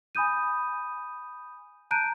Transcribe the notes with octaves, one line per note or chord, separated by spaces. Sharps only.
G#5 B5 D#6 G6 D#7
A5 A#5 F#6 G6 D7 D#7